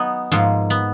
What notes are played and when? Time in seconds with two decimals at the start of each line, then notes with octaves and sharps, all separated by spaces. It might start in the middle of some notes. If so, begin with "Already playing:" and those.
Already playing: F#3 B3 D#4
0.32 G#2 F3 A#3
0.70 B3